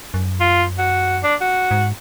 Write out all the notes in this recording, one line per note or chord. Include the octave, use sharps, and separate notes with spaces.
F#2
F4
F#4
D4
F#4
G#2